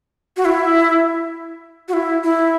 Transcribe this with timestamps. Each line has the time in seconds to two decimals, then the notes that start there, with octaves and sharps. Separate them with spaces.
0.37 F#4
0.45 E4
1.88 F#4
1.93 E4
2.24 E4